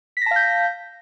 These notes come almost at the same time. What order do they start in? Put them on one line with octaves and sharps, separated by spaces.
B6 A#6 A5 F5 G6